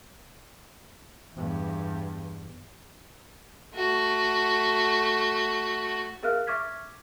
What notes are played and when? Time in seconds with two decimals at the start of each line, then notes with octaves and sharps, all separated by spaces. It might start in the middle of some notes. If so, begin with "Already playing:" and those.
1.35 E2 G2
3.75 A3 F#4
6.23 G#4 A#4 E5 F5 F6 F#6
6.47 E5 C#6 D6 F6 G#6 B6